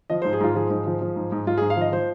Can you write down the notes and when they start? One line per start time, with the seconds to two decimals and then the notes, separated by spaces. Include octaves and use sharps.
0.10 F3 D#5
0.22 G#2 C5
0.33 G#4
0.41 G#2 F4
0.55 F3 G#4
0.70 G#2
0.86 F3
1.01 F3
1.16 G#2
1.32 G#2
1.47 G#2 F4
1.58 G#2 G#4
1.70 F5
1.77 F3 D#5
1.92 F3 C5